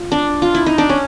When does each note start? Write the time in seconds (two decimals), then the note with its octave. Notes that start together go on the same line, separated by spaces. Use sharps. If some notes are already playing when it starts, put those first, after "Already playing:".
Already playing: F4
0.12 D4
0.42 F4
0.55 E4
0.66 D#4
0.78 D4
0.89 C#4